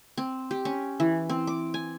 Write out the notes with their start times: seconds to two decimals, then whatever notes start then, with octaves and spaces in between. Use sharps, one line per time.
0.18 C4
0.51 G4
0.65 C#4
1.00 E3
1.29 C4
1.47 D6
1.74 G#5